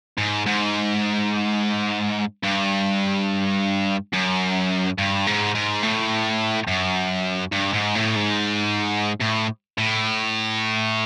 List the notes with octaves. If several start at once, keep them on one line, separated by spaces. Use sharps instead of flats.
G#2
G#2
G2
F#2
G2
G#2
G#2
A2
F#2
G2
G#2
A2
G#2
A2
A2